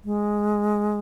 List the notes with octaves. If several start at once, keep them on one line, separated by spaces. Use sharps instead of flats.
G#3